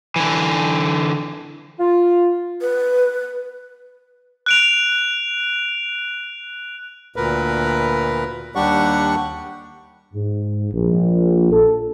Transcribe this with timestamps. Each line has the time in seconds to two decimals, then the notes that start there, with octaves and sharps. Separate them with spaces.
0.16 D3 E3
1.79 F4
2.61 B4
4.46 F#6 D7 F7
7.16 D2 A#2 A#4 B4
8.55 D#2 G3 D4 G4 F#5 C#6
10.14 G#2
10.73 A#1
11.52 A4